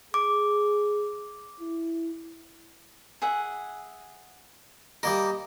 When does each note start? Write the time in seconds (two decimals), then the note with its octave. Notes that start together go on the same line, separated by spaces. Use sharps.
0.14 G#4 D6
1.61 E4
3.22 G#4 E5 F#5
5.03 G3 A#3 A#4 D#5